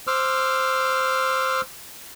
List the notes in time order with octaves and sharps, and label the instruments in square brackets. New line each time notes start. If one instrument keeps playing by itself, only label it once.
[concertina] C5 D6 E6 F6